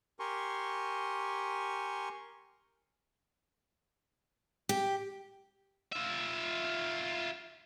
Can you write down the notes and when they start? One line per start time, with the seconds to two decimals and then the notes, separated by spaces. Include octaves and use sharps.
0.20 G4 A#4 G#5 C6 C#6
4.69 G4
5.92 F4 E5